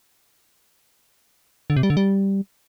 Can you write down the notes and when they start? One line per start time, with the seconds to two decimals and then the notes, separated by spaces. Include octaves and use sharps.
1.70 D3
1.76 C3
1.83 G3
1.90 D3
1.97 G3